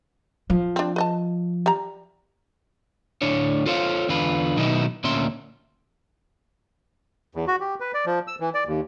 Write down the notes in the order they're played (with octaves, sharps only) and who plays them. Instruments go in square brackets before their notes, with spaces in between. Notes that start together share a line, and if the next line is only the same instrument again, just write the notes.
[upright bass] F3
[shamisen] C4 D4
B4 D#5 A5
G3 A#5
[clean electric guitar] D2 A2 D4 C#5
F4 A4 C5 C#5 E5 F5
E2 D3 F4 B4
B2 D#3 F#3 B3 D#4 E4
D2 A#2 A#3 C#4 E5 C6
[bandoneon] E2
F#4
G4
B4
D5
F3
E6
E3
D5
D#2